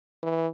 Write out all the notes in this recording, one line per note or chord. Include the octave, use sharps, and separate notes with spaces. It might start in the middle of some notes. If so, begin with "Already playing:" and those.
E3